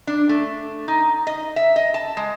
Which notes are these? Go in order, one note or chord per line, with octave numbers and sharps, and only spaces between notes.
D4
A3
D#4
D#5
E5
D#5
A5
G#3